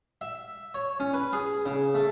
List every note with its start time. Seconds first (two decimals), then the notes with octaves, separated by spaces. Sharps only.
0.21 E5
0.74 C#5
1.00 C#4
1.13 B4
1.33 G#4
1.66 C#3
1.95 A3